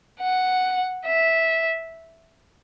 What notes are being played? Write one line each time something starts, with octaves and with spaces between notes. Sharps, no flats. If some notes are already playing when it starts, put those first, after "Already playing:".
F#5
E5